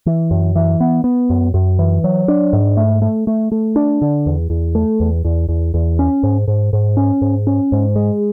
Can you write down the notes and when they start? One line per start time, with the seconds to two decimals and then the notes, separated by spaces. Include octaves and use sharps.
0.06 E3
0.31 F#2
0.56 E3
0.80 B3
1.04 B3
1.30 F#2
1.54 F#2
1.79 E3
2.04 F#3
2.28 D4
2.53 G#2
2.77 A3
3.02 A3
3.27 A3
3.52 A3
3.76 D4
4.02 D3
4.26 E2
4.50 E2
4.75 A3
5.00 E2
5.25 E2
5.49 E2
5.74 E2
5.99 C#4
6.23 G#2
6.48 G#2
6.73 G#2
6.97 C#4
7.22 G#2
7.47 C#4
7.72 G#2
7.96 G#3